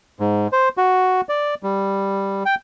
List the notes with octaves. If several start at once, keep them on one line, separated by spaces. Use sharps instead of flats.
G#2
C5
F#4
D5
G3
G5